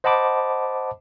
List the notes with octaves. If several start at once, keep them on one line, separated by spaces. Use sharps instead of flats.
C5 D#5 F#5 A5 B5 D6